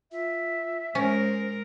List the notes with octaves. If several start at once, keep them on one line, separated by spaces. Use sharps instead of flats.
F4 E5
G#3 C#4 A#4 C5